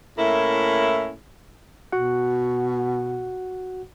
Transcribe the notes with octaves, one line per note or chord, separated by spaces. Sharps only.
A2 A#3 C#4 E4
B2 F#4 F#5